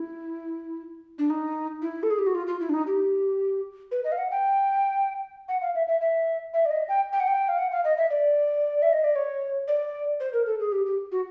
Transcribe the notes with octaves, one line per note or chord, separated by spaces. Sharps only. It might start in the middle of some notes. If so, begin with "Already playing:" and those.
Already playing: E4
D4
D#4
E4
A4
G#4
G4
F#4
F4
F4
E4
D4
D#4
G4
B4
D#5
F5
F#5
G5
F#5
F5
E5
E5
E5
E5
D5
D#5
G5
G5
F#5
G5
F5
F#5
F5
D#5
E5
D5
E5
D#5
D5
C#5
D5
C5
A#4
A4
G#4
G4
G4
F#4